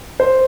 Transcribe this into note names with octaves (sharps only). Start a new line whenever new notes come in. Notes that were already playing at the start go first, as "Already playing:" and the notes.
C5